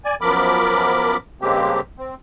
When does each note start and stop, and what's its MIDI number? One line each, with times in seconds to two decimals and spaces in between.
0.05 0.15 74
0.05 0.15 80
0.21 1.17 42
0.21 1.17 53
0.21 1.17 59
0.21 1.17 70
0.21 1.17 83
0.21 1.17 86
1.41 1.80 43
1.41 1.80 49
1.41 1.80 56
1.41 1.80 58
1.41 1.80 60
1.41 1.80 67
1.98 2.15 60